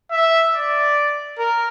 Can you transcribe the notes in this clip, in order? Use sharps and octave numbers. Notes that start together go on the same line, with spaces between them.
E5
D5
A#4